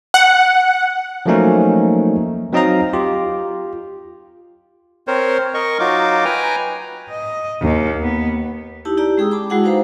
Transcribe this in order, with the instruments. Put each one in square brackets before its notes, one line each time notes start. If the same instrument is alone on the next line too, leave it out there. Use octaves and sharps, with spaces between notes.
[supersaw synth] F#5
[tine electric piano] F3 F#3 A3 A#3 C#4 D#4
F#3 C4 D#4 D#5 F5 A#5
F4 G4
[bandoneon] C4 A#4 C5 C#5
A#4 D#5 C#6
F#3 D#4 F4 F#4 D6
B4 G5 G#5 A#5
[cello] D#5
D#2
B3
[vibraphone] D#4 E4 G4 A5
E4 G4 D5 A#5
G#3 C#4 G#4 G5 D#6 E6
A5 B5 D6
G#3 E4 F#4 G#4 F#5 G5
D#4 B4 C5 F5 A#5 B5